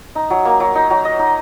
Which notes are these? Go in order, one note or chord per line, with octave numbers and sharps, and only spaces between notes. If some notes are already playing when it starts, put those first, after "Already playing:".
D#4
F#3
A#3
F#3
D#4
F#3
D#5
D#4